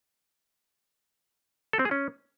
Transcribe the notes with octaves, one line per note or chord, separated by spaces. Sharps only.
A4
C4
G#4
C#4